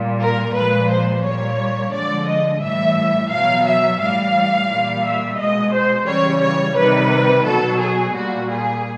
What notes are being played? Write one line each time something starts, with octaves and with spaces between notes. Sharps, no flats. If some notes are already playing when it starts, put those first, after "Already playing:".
Already playing: A#2 G3
A#4
A#2 F3 G#3 B4
C5
A#2 G3 C#5
D3 F3 G#3 D5
D#5
A2 E3 G3 E5
B2 F#3 F5
E5
A2 E3 G3 F5
A#2 G3
E5
B2 G#3 D#5
C5
C#3 E3 G3 C#5
C#5
C3 D#3 G3 B4
B2 F#3 A4
G#4
A#2 G3 F#4
G#4